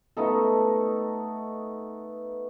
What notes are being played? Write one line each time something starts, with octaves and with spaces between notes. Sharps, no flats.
A3 B3 D#4 A4